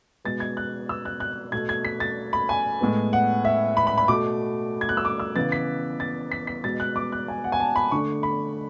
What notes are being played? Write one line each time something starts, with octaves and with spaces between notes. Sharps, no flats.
B2 G#3 B3 A6
G#6
F#6
E6
F#6
F#6
B2 A3 G#6
G#6
B6
A6
B5
G#5
A2 G#3 B3
F#5
E5
B5
B5
B5
B2 A3 D6
G#6
F#6
E6
D6
E6
C#3 E3 B3 A6
B6
A6
B6
B6
B2 G#3 B3 A6
F#6
D6
F#6
G#5
F#5
G#5
A5
B5
D3 A3 C#6
B5